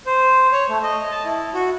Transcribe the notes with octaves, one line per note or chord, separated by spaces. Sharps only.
C5
C#5
A3
D#5
A5
E4
F#4